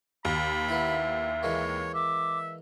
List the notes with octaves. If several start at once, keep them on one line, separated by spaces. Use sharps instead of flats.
D#2 B5
B3 E4 E5
E3 G#3 A#3 C#5
E5 D6